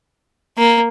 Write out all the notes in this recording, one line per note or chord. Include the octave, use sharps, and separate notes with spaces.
A#3